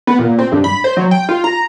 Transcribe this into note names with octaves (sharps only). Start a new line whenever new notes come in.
B3
A#2
C4
G2
B5
C5
F#3
G5
F4
A#5